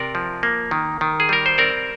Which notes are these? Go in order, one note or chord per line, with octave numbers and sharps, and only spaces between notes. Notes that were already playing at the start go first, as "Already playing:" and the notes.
Already playing: C3 A#4 D5
F3
A#3
D#3
D#3
G#4
G3 A#4
C5
C4 A#4 D5